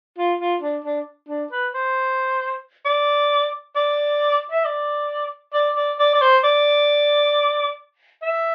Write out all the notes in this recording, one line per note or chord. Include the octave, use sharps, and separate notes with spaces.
F4
F4
D4
D4
D4
B4
C5
D5
D5
E5
D5
D5
D5
D5
D5
C5
D5
E5